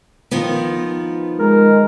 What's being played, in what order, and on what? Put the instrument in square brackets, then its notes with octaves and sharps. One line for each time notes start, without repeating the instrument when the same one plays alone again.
[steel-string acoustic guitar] D#3 F3 B3
[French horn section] G#3 [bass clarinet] A#4